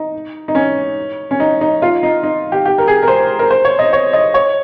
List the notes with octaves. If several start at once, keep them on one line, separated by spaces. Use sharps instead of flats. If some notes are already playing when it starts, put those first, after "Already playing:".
Already playing: D#4
D#4
C#4
C#4
D#4
D#4
F4
D#4
D#4
G4
G4
A#4
G#4
A#4
C5
A#4
C5
C#5
D#5
C#5
D#5
C#5